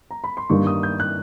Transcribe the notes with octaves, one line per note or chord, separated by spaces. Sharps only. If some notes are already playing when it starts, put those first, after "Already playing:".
A#5
B5
C6
G2 D#3 G3 A#3 D#4 C#6
D#6
G6
F#6